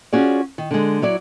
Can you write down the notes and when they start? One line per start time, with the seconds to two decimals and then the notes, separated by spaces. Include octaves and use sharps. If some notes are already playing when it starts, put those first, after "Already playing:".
0.13 C#4 F4 F#4 G#4 D5
0.58 D#3
0.71 D3 G#3
1.02 F#3 E4 D5